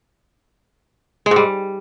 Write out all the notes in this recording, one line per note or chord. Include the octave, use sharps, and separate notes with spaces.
G#3
G#2
G3